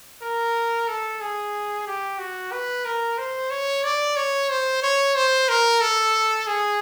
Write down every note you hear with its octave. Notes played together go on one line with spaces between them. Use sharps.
A#4
A4
G#4
G4
F#4
B4
A#4
C5
C#5
D5
C#5
C5
C#5
C5
A#4
A4
G#4